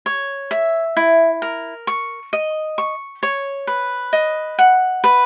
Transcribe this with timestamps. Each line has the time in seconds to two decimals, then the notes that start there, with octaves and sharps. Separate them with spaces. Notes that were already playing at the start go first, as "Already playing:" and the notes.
0.06 C#5
0.51 E5
0.97 E4
1.42 A#4
1.87 C#6
2.33 D#5
2.78 C#6
3.23 C#5
3.67 B4
4.13 D#5
4.59 F#5
5.04 B4